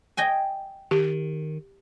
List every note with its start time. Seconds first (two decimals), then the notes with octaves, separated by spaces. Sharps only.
0.17 D#5 G5 G#5
0.91 D#3 G4